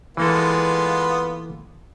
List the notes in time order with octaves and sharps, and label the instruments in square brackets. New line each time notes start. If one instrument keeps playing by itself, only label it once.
[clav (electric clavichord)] E3 A#3 A4 [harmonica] G#3 B3 F4